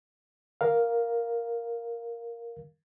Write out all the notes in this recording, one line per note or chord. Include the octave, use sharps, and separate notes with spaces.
A#4 F5